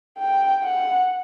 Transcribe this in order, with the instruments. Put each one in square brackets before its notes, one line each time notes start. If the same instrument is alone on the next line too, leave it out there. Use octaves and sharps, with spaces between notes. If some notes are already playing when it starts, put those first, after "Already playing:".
[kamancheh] G5
F#5